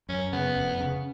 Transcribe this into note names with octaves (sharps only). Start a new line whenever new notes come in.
F#2 C#4
C#3 B3
F1
C#3